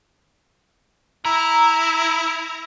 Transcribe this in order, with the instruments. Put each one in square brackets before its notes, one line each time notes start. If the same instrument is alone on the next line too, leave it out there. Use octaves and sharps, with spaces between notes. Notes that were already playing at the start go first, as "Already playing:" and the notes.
[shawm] E4 [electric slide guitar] A#5